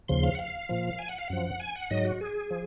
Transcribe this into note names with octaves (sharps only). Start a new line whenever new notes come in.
D#2 C#3 F3 C6
F5
F#5
F5
A#2 F3
G#5
F#5
F5
F#2 F3 F#5
G#5
F#5
G#2 F#3 D#5
F#4
G#4
F3